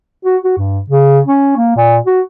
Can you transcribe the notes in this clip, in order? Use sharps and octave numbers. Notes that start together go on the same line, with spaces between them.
F#4
F#4
G2
C#3
C#4
A#3
A#2
F#4